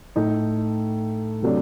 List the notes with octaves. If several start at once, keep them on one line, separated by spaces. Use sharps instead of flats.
A2 A3 D#4
C3 F#3 A3 D4